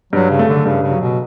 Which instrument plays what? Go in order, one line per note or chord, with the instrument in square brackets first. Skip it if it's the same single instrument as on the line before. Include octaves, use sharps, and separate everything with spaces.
[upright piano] G2 [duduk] F#3
[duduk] C#3
[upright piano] A3
[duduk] D3
[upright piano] G2 [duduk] C#3
[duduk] C#3
[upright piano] F#3
[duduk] B2